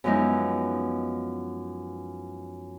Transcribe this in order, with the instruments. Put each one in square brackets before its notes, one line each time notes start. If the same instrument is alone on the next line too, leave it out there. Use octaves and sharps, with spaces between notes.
[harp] F#2 F3 G#3 B3 D#4 E4